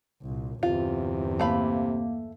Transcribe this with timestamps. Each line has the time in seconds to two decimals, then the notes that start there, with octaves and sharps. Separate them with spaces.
0.22 C2 A#2
0.63 G1 E2 C3 F4
1.40 A3 A#3 F5 B5